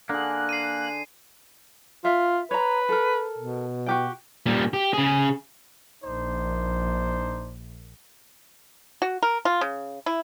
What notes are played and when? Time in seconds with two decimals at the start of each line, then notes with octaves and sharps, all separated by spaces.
0.09 D3 A#3 G#4 F#6
0.49 C7 D#7
2.05 F4 E5
2.51 B4 C#5 A#5
2.89 A4 A#4
3.38 B2
3.86 F#4 G4 G5
4.46 A#2 G3
4.73 G4
4.93 C#3 G#4
6.04 A#1 D4 D#4 C5
9.02 F#4
9.23 A#4
9.45 F4
9.61 C#3
10.06 E4